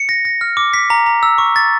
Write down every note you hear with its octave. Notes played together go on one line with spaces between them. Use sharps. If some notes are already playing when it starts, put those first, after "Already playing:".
Already playing: C#7
A#6
A#6
F6
D6
B6
A#5
A#5
E6
C#6
A6